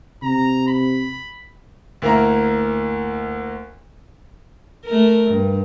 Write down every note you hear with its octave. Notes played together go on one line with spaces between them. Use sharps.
C3 A#5
B5
D2 A#3 E4 A#5
A3 A#4
G2